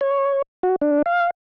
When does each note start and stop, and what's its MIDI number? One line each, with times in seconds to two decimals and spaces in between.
0.01 0.42 73
0.63 0.76 66
0.81 1.02 62
1.06 1.30 77